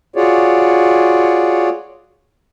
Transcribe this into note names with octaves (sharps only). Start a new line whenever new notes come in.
F4 F#4 G#4 C#5 D5